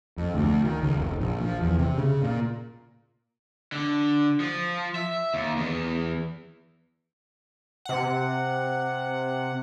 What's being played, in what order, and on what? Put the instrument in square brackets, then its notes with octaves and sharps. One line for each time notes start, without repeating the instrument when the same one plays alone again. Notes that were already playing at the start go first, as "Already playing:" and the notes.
[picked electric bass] F2
D2
D#3
C#2
F1
A#1
F3
E2
C3
C#3
A#2
[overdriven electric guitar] D3
F3
E5
D#2
E2
[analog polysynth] C3 F#5